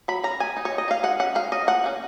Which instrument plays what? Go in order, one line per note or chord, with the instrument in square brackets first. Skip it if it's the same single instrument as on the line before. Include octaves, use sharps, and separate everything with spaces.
[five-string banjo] F#3 B5
C#4 A#5
G#3 G#5
D#4
C#5
G#3
D#5
D#4 F5
G#3 F#5
C#4 F#5
G#3 F5
C#4 D#5
F3 F#5
A#3 C#4